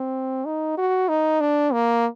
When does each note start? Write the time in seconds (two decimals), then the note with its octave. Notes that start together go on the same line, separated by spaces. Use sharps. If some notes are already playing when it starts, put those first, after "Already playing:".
Already playing: C4
0.45 D#4
0.77 F#4
1.09 D#4
1.40 D4
1.73 A#3